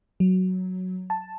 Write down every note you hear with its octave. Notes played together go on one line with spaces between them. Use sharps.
F#3
A5